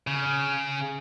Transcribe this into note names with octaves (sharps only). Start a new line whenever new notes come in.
C#3